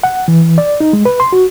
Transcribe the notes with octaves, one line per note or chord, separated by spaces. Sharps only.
F#5
E3
D5
D#4
G#3
B4
C6
F#4